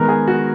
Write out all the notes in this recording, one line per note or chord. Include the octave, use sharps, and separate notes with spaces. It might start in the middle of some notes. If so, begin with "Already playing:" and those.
Already playing: D#3 G#3 B3 A#4
G#4
F#4